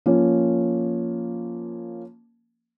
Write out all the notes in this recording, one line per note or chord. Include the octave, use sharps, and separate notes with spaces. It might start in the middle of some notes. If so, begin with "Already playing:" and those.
F3 A#3 C#4